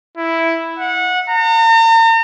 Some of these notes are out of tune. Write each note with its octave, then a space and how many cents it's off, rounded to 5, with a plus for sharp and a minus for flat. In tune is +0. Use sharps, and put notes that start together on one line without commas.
E4 +0
F#5 -20
A#5 -45